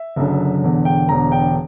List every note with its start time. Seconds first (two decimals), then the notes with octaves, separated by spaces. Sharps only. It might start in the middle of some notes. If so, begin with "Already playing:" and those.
Already playing: E5
0.16 F#1 F#2 D3
0.63 E1 E2 D3
0.85 G5
1.08 E1 E2 D3 A#5
1.32 G5